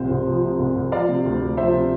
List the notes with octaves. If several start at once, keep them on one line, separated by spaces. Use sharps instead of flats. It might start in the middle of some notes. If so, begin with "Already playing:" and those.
Already playing: C2 C3 F3 C5
C2
F3
C3
C2
C2
F3 D5 F5
C3
D2
D2
F3 C5 E5
C3